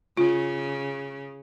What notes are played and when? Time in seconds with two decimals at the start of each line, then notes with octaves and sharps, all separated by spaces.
0.17 C#3 F4